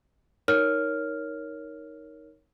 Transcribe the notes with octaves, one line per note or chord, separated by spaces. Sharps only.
D#4 A#4 C#5 F6